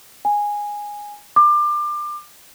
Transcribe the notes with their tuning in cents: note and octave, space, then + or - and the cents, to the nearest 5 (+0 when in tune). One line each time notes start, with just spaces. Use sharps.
G#5 -10
D6 +25